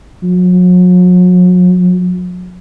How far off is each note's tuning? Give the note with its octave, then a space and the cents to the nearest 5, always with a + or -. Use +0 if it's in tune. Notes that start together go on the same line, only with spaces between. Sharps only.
F#3 -40